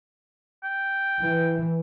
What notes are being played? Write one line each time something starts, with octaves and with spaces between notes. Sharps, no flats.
G5
E3